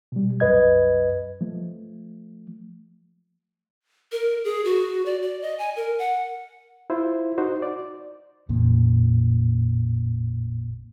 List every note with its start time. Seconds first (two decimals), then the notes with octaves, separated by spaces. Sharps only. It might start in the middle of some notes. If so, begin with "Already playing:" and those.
0.12 B2 G3
0.40 C2 F#2 B4 D#5 G#6
1.41 F3 A3
4.12 A#4
4.44 G#4
4.65 F#4
5.06 D5
5.22 D5
5.42 D#5
5.59 G#5
5.76 A#4
5.99 F#5
6.90 E4 F4 C5
7.38 D#4 F#4 C5
7.62 D5
8.49 A1 F2 A#2 C#3